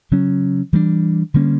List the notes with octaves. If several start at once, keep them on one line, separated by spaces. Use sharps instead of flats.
C#3 F#3 C#4
E3 G3 A#3 D4
D3 G3 A#3 C#4